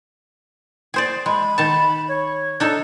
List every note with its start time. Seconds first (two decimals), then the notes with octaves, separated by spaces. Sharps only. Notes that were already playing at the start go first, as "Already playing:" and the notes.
0.94 G#4 C5 D5
1.26 G#3 B5
1.58 D#3 A5
2.08 C#5
2.60 D4 D#4 A4